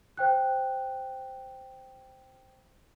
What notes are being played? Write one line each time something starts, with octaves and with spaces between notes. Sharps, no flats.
C5 G5 F#6